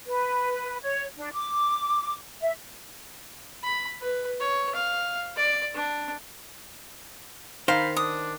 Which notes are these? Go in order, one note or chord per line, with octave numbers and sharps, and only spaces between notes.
B4
C#5
D4
D6
E5
B5
B4
C#5
F5
D5
D4
D#3 C5 F5 B5
D4 D#6